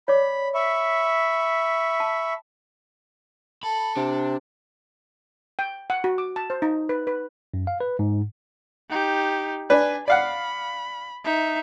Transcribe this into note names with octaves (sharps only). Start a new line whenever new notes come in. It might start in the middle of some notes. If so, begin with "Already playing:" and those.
C#5 D5 B5 D6
E5 B5 C#6
A5
A4 B5
C3 D4
G5
F#5
F#4
D6
A5
C5
D#4
B4
B4
F#2
F5
B4
G#2
D#4 G4
D4 B4 G#5
D5 F5 F#5 B5
D#4 E5